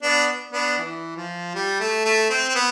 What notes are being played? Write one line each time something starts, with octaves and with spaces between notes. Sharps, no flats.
B3 D4
B3 D4
E3
F3
G3
A3
A3
C4
C4
B3